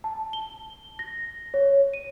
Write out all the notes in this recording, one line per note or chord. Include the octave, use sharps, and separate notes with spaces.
A5
G7
A#6
C#5
D#7